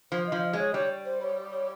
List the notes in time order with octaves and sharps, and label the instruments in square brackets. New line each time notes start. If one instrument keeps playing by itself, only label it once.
[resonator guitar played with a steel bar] F3 [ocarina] C5
[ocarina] D#5
[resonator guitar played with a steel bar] F3
[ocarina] D#5
[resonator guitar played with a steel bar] G#3 [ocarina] C#5
[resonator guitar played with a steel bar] G3 [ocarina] C#5
[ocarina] C5
C#5
C#5